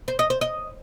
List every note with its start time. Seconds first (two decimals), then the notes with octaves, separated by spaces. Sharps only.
0.08 C5
0.19 D#5
0.30 C5
0.41 D#5